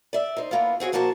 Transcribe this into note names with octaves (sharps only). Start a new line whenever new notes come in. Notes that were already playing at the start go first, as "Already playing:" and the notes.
D5 E5
D#4 C5
E3 A#3 B3 D4 F4
C4 F#4 G#4 C#5
A#2 F3 A#3 F#4 G#4 A5